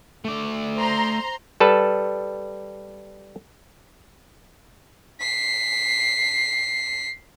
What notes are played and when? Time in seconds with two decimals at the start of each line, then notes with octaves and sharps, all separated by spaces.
0.25 A3 D5
0.78 C5 A#5 C6
1.60 G3 A4 B4 A5
5.20 B6 C7